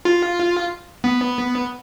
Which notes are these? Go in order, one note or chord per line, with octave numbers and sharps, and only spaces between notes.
F4
B3